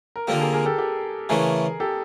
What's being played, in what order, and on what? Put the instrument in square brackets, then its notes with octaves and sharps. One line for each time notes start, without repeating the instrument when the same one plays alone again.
[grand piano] A#4
[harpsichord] D3 F3 A#3 [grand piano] G4 A4
[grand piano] G#4 A#4
G#4 A#4
G4 A4
G4 A4
[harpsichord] C#3 E3 A3 [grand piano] G#4 A#4
[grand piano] G4 A4